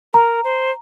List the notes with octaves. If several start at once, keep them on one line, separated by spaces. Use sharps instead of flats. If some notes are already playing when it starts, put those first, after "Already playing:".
A#4 A#5
C5